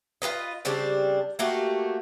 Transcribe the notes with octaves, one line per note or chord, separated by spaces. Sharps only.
F4 G#4 B4 D#5
C#3 G3 C4 D4
A3 A#3 F#4 G4